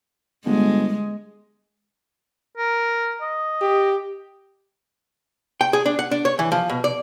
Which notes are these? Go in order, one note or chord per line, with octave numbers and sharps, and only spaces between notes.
G1 G#3
A#4
D#5
G4
G5
G#4
D4
F#5
D4
C#5
E3
F3
B2
D5